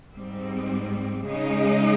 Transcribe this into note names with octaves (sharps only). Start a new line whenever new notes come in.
G#2 G3 C4
C#3 G#3 D#4